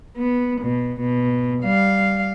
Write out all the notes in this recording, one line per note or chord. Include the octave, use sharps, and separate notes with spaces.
B3
B2
B2
G3 F5